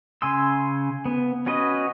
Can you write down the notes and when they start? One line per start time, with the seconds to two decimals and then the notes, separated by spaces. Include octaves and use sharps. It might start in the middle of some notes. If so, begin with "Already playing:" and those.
0.22 C#3 G#5 C6 E6
1.06 B3
1.46 C#4 F#4 B4 D#5